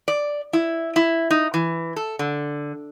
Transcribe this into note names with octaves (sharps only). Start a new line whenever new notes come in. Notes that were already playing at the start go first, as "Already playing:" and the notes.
D5
E4
E4
D#4
E3
A4
D3